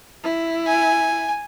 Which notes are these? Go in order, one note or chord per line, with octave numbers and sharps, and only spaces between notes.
E4
G#5